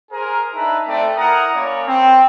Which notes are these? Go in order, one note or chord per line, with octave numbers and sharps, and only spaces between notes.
G#4 A#4 C5
D4 D#4 B4 E5 A5 A#5
A3 C4 D5
E4 A#4 F#5 A#5 D#6
A#3 C#4 C#5 D5 A#5 B5
C4